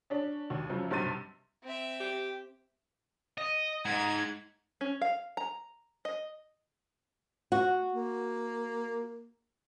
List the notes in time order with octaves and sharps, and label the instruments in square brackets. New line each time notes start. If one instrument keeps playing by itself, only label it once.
[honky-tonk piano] C#4 D4
D#2
F#2 C#3 F3
B1 G2 C3 C6 A6 D#7
[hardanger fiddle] C4 E5
[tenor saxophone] G4
[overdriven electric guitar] D#5
[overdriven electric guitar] G#2 [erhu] G#6
[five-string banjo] C#4
F5
A#5
D#5
[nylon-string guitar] F#4
[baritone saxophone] A#3